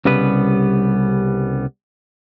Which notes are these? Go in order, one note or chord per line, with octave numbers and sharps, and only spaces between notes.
C2 C#3 G3 B3 B4